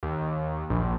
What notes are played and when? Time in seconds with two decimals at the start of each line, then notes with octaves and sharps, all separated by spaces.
0.03 D#2
0.70 A#1